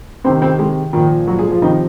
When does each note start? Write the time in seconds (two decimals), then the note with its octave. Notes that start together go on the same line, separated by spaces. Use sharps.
0.24 C3 D#3 C4 C5
0.42 C4 C5
0.59 G#3 G#4
0.93 A#2 D#3 F3 D#4
1.27 F#3 F#4
1.39 G#3 G#4
1.51 F3 F4
1.61 C3 D#3 F3 D#4